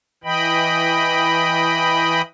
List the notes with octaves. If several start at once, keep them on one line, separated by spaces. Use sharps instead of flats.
E3 D#5 G5 B5